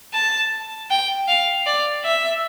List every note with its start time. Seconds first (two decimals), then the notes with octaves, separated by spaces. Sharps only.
0.14 A5
0.90 G5
1.28 F5
1.66 D5
2.05 E5